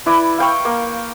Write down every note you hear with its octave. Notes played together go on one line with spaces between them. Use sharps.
E4 B4 D5
F5 G5 C#6
A#3